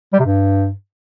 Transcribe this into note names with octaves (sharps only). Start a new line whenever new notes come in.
G3
C3
G2